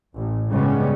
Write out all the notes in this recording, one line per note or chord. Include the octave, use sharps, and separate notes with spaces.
A1
G2 C#3 G3 G#3 B3 C#4